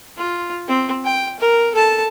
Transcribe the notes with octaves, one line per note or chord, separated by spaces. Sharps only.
F4
C4
G5
A#4
A4 A5